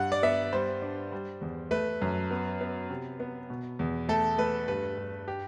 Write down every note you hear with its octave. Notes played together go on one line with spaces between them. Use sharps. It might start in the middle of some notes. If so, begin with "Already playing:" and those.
Already playing: G2 F#5
D5
B3 E5
G3 C5
D4
G3
E2
A3 B4
F#2
B3
B3
C3
B3
B2
E2
A3 A4
A3 B4
G2 B4
G2
G4